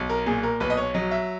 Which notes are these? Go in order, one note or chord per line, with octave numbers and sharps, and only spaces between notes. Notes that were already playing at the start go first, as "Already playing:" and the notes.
Already playing: B1
A#4
A#2 G#4
A#4
B1 B4
D#5
C#5
F#3 D#5
E5